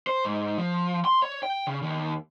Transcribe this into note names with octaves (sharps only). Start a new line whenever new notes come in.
C5
G#2
F3
C6
C#5
G5
C#3
D#2